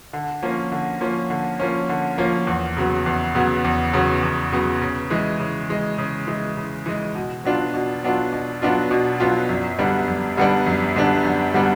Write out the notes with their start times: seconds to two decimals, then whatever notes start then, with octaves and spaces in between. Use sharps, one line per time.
0.13 D3
0.42 F3 A#3 C#4
0.72 D3
1.01 F3 A#3 C#4
1.30 D3
1.60 F3 A#3 C#4
1.89 D3
2.18 F3 A#3 C#4
2.47 E2
2.77 C#3 F#3 B3
3.06 E2
3.35 C#3 F#3 B3
3.64 E2
3.93 C#3 F#3 B3
4.23 E2
4.52 C#3 F#3 B3
4.82 C#3
5.10 E3 G#3
5.40 C#3
5.69 E3 G#3
5.98 C#3
6.27 E3 G#3
6.57 C#3
6.86 E3 G#3
7.15 B2
7.44 F#3 B3 D4 F4
7.74 B2
8.03 F#3 B3 D4 F4
8.33 B2
8.62 F#3 B3 D4 F4
8.91 B2
9.20 F#3 B3 D4 F4
9.49 F#2
9.79 D3 G3 B3 D4
10.08 F#2
10.37 D3 G3 B3 D4
10.66 F#2
10.96 D3 G3 B3 D4
11.24 F#2
11.54 D3 G3 B3 D4